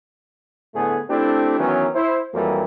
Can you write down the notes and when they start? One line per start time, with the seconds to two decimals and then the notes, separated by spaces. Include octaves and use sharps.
0.75 A2 D3 A3 B3 G#4
1.09 A3 C4 D4 E4 G4
1.59 D#3 E3 F#3 B3 C#4
1.95 E4 C5
2.34 F2 E3 F#3 G3 A#3